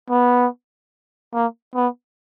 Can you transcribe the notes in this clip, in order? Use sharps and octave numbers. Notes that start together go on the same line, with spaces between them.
B3
A#3
B3